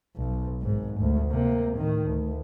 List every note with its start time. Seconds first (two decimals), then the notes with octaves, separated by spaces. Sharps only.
0.17 B1
0.60 G#1 G#2
0.98 G#1 D2
1.31 C3 A#3
1.77 A2 D#3
2.06 D2